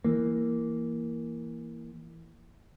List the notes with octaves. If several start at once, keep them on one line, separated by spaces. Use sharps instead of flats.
E3 A#3